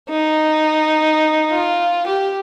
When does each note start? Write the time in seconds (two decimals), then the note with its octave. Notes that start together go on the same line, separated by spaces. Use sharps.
0.09 D#4
1.51 F4
2.06 G4